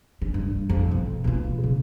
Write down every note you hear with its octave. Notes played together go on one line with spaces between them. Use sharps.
D3
G2
A1 F2
B2
B2 F4
C#3